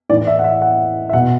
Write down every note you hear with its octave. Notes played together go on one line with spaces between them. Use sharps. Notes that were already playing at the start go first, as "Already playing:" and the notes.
A2 E3 D5
E5
F#5
E5
F#5
E5
B2 F#5